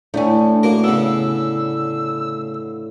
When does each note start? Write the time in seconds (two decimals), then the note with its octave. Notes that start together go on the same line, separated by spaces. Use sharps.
0.14 A2 D3 E3 A3 C#4 D4
0.63 A#3 F#4 A#4
0.84 C#3 B3 E6